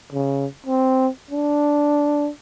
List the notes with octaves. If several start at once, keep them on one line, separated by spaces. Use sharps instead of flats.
C#3
C4
D4